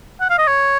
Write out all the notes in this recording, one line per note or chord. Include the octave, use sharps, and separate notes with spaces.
F#5
F5
D#5
C#5